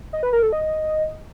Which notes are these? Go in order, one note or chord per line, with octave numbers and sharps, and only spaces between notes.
D#5
B4
A#4
A4
D#5